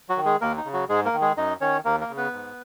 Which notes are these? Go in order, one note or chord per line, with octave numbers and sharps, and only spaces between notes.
F#3 F#4
D#3
G#3 G#4
D#2 A#3 A#4
D#4
C#3
F#3 F#4
G#2 G#3 G#4
A#3 A#4
D#3
G#3 G#4
F#2 D#4 D#5
D#3 C#4 C#5
D#2 A#3 A#4
A#3 A#4
C#3
B3 B4
G#2